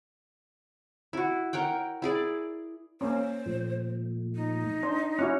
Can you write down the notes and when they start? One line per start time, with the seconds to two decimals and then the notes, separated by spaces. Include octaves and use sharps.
1.13 E4 F#4
1.53 A#4 C#5 F#5 G5
2.02 E4 G#4 D5
3.01 A#3 C#4 C5
3.46 A#2 F3 A3
4.35 D#4
4.83 D4 C5
5.19 C#4 E4 F#4 F#5 C#6 F6